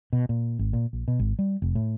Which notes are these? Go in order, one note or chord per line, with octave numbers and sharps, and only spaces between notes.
B2
A#2
G#1
A#2
A#1
B2
G#1
G3
F1
A2